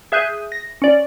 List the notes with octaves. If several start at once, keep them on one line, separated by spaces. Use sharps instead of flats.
G#4 E5 F#6 G6 D#7
A#6
C#4 D5